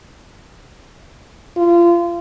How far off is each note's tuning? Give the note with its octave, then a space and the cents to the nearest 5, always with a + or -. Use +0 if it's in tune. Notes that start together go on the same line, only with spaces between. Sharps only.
F4 -25